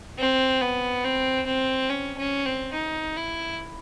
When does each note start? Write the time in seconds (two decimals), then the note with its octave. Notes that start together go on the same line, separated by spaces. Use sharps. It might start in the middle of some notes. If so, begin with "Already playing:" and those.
0.19 C4
0.61 B3
1.04 C4
1.46 C4
1.89 C#4
2.18 C#4
2.46 C4
2.73 D#4
3.17 E4